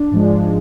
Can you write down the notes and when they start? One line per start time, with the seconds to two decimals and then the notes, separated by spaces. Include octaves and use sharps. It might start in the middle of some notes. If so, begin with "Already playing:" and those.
Already playing: D4
0.12 G#2 F3 G#3